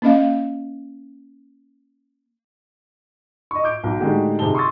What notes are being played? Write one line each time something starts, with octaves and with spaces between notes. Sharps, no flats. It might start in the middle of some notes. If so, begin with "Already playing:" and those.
A#3 C#4 D#5 F5
D#5 C#6
D6 G6 D7
B1
A2 D3 G#3 D#4 F#4 G4
G1 C3 D#4 G#4 A5 G7
C6 C#6 D#6 E6 A6